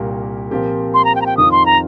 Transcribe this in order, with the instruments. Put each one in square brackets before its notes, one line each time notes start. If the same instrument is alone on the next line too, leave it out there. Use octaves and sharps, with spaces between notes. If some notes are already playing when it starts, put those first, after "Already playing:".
Already playing: [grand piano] C2 A#2 A#3 G4 A#4
A#2 F3 C4 G4 A#4
[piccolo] C6
A#5
G5
A#5
G5
[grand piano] F2 D#3 C4 F4 [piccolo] D#6
[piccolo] C6
A#5